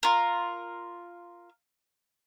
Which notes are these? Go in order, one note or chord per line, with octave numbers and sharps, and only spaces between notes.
F4 A#4